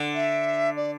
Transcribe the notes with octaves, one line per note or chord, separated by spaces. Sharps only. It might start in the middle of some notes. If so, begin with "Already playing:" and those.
Already playing: D3
E5
D5